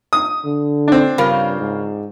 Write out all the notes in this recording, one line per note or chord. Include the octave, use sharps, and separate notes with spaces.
D#6
D3
C4 D4
G2 C#3 F4 A#4
G#2